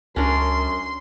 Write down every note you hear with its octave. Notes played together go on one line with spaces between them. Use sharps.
C#2 F#2 C#4 D4 A#4 C6